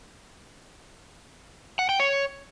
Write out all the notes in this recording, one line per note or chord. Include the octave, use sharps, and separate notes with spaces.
F#5
G5
C#5